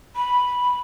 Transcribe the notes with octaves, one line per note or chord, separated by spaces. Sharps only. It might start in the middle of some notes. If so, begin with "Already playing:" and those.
B5